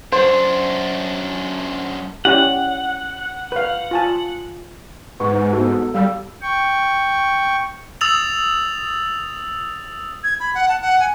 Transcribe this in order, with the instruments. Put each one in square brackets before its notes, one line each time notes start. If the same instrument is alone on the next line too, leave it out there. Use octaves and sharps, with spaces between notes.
[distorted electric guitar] F#2 D4 [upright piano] C5
[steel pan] C#4 E4 G4 [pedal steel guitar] F#5
[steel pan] B4 F5
F4 G#5 A5
[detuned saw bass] G#2 [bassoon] B3 [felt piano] C#6
[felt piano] B3 F#4 [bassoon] A4
[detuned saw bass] G3 [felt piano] F5 E6
[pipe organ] G5 C#6
[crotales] D#6 E6 A6 F7 F#7
[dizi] G#6
B5
F#5
A5
F#5
G#5